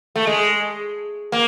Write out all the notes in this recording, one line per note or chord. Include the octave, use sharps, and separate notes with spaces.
A3
G#3
A#3